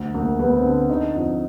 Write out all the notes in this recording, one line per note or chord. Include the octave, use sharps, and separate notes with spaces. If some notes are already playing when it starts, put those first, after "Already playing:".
Already playing: D2
D2 A#3
D2 B3
C4
D3
D3 D#4
F2